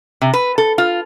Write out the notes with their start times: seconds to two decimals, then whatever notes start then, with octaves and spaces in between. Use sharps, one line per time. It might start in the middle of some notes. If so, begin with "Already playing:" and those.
0.22 C3
0.33 B4
0.58 A4
0.78 F4